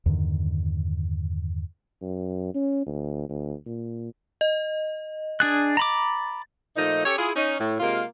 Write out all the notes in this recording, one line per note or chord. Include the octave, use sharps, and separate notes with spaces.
E2 G2 D3 D#3
F#2
C#4
D2
D2
A#2
D#5
D4 G#4 F#6 A6
A#5 B5 D6
A#2 F3 A3 D#4
C#4 G4 A4 C#5
E4 F4 G#4
C#4 D#4
A2
C3 G#3 A#3 F4 A#4